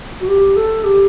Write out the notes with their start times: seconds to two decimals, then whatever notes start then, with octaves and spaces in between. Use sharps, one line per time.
0.21 F#4
0.28 G4
0.56 A4
0.84 G4